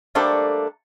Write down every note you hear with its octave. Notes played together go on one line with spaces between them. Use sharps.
G3 A3 A#3 D4 A4 C5